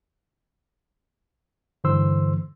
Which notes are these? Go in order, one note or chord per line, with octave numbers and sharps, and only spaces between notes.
G2 D3 E3 C5 C6 E6